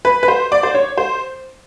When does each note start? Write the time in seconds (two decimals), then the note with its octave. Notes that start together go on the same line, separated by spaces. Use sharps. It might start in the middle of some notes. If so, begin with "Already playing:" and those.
0.05 B4
0.23 B4
0.28 C5
0.52 D5
0.63 C5
0.75 C#5
0.98 C5